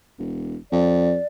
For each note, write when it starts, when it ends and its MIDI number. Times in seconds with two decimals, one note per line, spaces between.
0.18 0.56 28
0.72 1.17 41
0.72 1.27 74